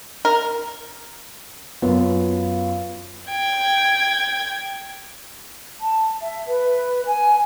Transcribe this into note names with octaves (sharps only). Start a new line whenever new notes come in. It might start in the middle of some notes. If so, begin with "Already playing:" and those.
A#4
F#2 B3 F4
G5 G#6
A5
E5
B4
G#5